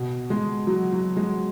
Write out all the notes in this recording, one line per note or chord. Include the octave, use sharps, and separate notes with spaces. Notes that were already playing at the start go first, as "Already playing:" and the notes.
Already playing: B2
G#3
F#3
F#3
G#3